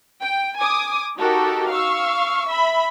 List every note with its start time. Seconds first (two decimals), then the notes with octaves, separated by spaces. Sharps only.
0.22 G5
0.57 G#5 D6 D#6
1.17 D#4 F#4 G4 A4 A#4
1.71 F5 C#6 E6
2.49 E5 B5